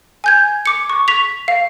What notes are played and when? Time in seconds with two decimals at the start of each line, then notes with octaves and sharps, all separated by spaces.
0.24 G#5 G6 G#6
0.66 D6 C#7
0.90 C#6
1.08 C#6 B6 F7
1.48 F5